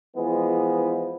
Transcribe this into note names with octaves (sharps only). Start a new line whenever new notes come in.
E3 F3 G#3 B3